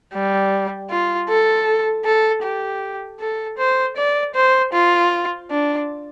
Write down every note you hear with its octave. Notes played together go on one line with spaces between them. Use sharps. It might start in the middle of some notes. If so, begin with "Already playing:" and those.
G3
F4
A4
A4
G4
A4
C5
D5
C5
F4
D4